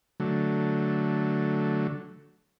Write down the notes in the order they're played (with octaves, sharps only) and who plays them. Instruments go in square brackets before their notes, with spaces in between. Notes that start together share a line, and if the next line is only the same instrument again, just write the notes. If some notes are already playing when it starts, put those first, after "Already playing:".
[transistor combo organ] D3 F#3 A3